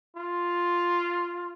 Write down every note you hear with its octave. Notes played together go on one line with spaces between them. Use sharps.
F4